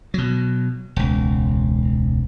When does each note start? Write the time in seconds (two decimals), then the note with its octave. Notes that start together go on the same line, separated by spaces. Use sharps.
0.14 B2 F#3
0.96 E1 C#2